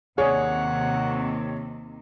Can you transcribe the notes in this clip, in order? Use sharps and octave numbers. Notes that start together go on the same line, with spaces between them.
D#2 C3 D#3 G#4 C#5 D5 F#5